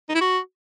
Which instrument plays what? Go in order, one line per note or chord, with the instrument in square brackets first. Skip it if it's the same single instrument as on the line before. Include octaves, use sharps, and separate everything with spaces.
[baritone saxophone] D#4
E4
F#4